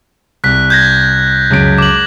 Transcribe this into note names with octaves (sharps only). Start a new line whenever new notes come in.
C2 F#6 B6
G6 G#6 A#6
C#2 F#2 D7
D6 F#7